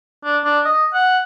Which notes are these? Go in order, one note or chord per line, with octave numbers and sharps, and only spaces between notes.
D4
D4
D#5
F#5